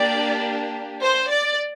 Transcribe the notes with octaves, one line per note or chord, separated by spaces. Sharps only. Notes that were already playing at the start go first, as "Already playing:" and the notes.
Already playing: A#3 D4 G4 D5
C5
D5